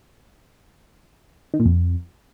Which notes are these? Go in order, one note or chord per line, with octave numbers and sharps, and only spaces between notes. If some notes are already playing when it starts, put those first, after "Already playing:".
D#3
A#2
F2